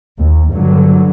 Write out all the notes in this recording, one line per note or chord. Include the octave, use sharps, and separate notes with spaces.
D#2
G2 D3 F#3